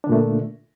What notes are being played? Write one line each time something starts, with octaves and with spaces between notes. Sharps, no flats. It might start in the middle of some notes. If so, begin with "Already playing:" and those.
A#2 D3 A3 D4